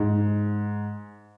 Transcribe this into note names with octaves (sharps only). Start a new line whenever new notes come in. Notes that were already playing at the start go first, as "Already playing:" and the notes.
Already playing: G#2